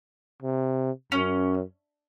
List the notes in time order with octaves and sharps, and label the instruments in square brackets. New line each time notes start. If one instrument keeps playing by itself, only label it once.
[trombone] C3
[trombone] F#2 [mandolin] C#4